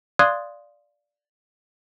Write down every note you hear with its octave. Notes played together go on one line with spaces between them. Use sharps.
D5 F5 C6 D#6 F#6 G#6